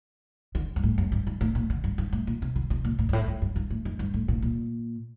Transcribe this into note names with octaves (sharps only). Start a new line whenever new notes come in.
D3
G2
A2
F#2
G2
G2
A2
A#2
D3
G2
G2
A2
A#2
C3
D3
C3
A#2
A2
G2
A2
G2
G2
G2
A2
F#2
G2
A2
A#2
A#2